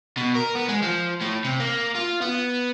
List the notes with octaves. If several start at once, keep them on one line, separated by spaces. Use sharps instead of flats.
B2
A#4
B3
G#3
F3
A2
C3
A#3
F4
B3